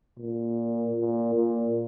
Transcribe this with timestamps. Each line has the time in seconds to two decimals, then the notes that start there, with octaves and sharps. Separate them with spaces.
0.19 A#2
0.96 A#2
1.34 A#2